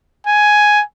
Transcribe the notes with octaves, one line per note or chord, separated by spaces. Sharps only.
G#5